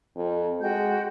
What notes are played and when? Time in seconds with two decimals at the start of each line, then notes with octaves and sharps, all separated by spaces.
0.16 F2
0.61 G#3 F#4 G5 G6